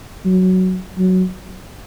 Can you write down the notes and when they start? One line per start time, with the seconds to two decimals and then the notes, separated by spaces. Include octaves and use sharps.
0.26 F#3
0.98 F#3